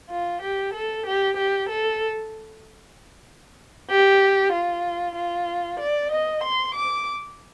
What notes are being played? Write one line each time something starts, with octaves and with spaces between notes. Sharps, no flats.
F4
G4
A4
G4
G4
A4
G4
F4
F4
D5
D#5
C6
D6